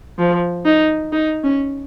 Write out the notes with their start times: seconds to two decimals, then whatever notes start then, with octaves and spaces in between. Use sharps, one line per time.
0.19 F3
0.66 D#4
1.13 D#4
1.44 C#4